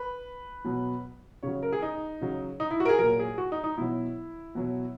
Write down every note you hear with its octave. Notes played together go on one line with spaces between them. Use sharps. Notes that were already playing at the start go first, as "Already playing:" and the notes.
Already playing: B4
B2 F#3
C#3 F#3 C#5
A#4
G#4
D#4
C#3 F#3
D#4
E4
F#4
A#4
G#4
A#2 F#3 A#4
G#4
F#4
D#4
D#4
B2 F#3 E4
B2 F#3